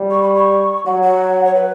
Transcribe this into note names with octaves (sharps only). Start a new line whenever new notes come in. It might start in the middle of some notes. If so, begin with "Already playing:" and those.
Already playing: G3
C#6
B5
C#6
F#3 F#5
F#5
C#5
B4